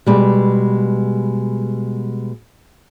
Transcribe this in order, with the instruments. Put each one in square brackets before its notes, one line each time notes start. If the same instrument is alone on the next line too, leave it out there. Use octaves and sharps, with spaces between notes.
[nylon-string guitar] B2 G3 G#3